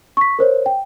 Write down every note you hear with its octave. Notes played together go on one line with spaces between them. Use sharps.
C#6 B6
A#4 C5 C#5
G5